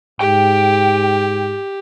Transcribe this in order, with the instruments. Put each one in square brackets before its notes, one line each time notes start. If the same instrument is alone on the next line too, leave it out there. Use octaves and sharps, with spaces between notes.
[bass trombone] G#2 [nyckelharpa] G4 [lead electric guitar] G5